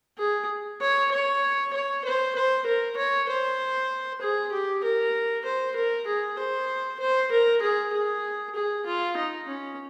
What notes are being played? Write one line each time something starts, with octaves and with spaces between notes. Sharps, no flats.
G#4
C#5
C#5
C#5
C5
C5
A#4
C#5
C5
G#4
G4
A#4
C5
A#4
G#4
C5
C5
A#4
G#4
G#4
G#4
F4
D#4
C#4